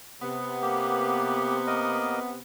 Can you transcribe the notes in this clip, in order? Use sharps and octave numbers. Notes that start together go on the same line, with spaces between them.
C3 B3
A#3 G4
A#3 A#4 D#5